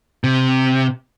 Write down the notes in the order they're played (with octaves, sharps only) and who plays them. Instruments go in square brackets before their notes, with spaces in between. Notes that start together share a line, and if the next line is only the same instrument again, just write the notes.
[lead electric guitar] C3